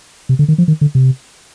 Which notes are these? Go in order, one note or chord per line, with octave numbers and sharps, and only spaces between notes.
C3
D3
D#3
F3
D#3
D3
C3